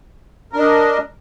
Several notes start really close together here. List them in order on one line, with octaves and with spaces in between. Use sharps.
A#4 D4 D#5